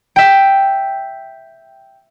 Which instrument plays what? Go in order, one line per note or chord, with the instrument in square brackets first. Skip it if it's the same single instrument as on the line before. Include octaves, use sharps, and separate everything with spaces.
[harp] E5 G5